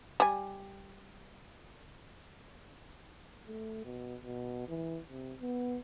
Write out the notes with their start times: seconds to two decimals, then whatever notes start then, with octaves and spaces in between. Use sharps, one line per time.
0.20 G3 G#5
3.47 A3
3.85 B2
4.21 B2
4.68 E3
5.09 C3
5.41 B3